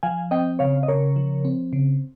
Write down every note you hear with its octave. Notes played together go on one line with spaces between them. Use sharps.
F3 F5 G#5
C4 D#5 G5
C#3 C#5 F5
D#5
C#3 A#4 C#5
F3
C4
C#3